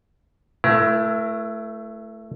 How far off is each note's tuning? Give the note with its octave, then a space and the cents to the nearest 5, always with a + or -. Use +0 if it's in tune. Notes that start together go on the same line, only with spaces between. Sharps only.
A3 +0 E4 +25 A#4 +45